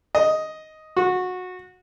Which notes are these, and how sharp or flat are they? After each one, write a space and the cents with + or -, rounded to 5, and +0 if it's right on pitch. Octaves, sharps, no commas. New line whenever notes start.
D#5 +5
F#4 -20